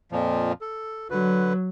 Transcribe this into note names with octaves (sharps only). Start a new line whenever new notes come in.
F2 A#2 F3
A4
D3 F#3 B4